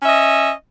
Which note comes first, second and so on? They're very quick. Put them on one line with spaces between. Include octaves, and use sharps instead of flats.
C#4 E5 D#5